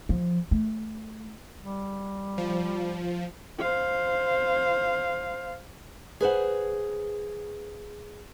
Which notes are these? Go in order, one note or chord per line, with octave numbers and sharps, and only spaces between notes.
F3
A3
G3
F3
C5 F5
G#4 B4 C5 F#5